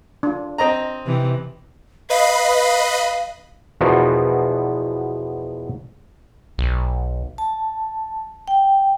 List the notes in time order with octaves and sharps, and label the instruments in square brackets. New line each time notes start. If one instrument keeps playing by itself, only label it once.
[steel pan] D4 F4
[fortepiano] C4 D#5 A#5
[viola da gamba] C3 E3
[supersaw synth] B4 D#5 B5 [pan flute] F5
[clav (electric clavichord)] E2 B2 F3 B3 F#4 A#4
[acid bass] B1
[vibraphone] A5
G5